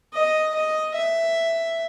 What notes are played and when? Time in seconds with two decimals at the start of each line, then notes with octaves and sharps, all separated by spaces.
0.14 D#5
0.55 D#5
0.95 E5